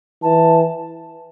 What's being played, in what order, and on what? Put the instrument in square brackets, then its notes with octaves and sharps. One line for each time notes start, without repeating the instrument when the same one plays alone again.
[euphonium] E3 [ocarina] A5